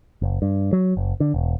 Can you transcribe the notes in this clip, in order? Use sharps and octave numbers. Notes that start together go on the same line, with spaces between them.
F#1
G2
F#3
F#1
D3
E1